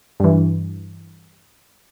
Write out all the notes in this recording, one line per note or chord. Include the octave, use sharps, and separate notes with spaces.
G2 E3